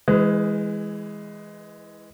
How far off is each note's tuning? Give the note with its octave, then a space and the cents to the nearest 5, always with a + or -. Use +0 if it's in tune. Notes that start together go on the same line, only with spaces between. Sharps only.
E3 -5 G#3 +0 B4 +45